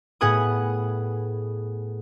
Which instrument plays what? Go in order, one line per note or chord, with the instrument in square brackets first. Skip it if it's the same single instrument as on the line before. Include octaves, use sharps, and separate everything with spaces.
[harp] A2 B3 G#4 F#5 G#5 D#6